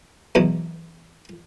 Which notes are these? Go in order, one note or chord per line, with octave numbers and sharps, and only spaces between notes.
E2 B2 F#3